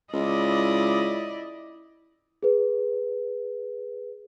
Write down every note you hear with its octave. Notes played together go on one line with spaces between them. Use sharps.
C#2 E4 D5 D#5
G#4 B4